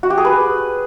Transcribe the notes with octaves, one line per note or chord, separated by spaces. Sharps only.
F#4
G4
G#4
B4